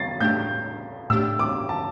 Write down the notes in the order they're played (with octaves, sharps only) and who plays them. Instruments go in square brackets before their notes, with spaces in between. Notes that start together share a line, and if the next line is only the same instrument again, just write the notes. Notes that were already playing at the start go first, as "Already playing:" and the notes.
Already playing: [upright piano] A6 C7
[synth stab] A2 A3 D4 G4 [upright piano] G6
[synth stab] A2 A3 D4 G4 [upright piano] E6
[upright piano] D6
A5